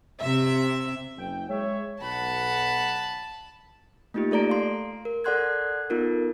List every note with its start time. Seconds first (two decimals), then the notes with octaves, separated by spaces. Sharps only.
0.19 C3 E5
1.18 F#1 G5
1.49 G#3 C#5 E5
2.01 B1 F#5 A5 B5
4.14 A3 A#3 D#4 F4 G4
4.31 A3 A4 D5 A#5 D7
4.50 F5 C6
5.05 A#4
5.24 A4 D5 F#5 C6 F#6 G#6
5.90 B3 D#4 F4 A4 A#4